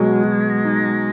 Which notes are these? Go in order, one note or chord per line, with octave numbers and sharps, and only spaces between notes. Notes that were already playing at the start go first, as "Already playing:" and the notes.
Already playing: B2 F#3 G#3
F#3
D#4